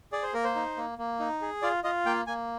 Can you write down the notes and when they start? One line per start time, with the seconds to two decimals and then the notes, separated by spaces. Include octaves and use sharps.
0.12 G#4 D5
0.23 C5
0.34 A#3 A#4
0.44 C5
0.55 D#4
0.77 A#3
0.98 A#3
1.20 D#4
1.41 G#4
1.62 F4 D5
1.84 F4 D#5
2.06 A#3 G5
2.27 A#3 G#5